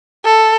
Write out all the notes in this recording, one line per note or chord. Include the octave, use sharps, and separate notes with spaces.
A4